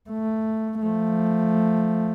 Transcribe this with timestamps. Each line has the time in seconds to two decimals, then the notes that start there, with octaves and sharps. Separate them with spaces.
0.10 A3
0.82 F3 A3